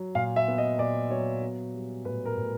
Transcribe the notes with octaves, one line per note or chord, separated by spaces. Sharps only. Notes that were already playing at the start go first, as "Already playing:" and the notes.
Already playing: F#3
A#2 F5
E5
B3
D#5
A#2 D5
F#3 C#5
B3
G3
A2 B4
A#4
A2